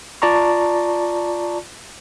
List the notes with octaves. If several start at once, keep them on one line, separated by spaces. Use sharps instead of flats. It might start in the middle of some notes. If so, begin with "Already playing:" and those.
F4 D5 A5 A#5 C#6